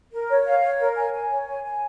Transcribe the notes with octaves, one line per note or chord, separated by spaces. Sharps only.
A#4
C#5
F5
C#5
A#4
G#5
G#5
C#5
G#5
G#5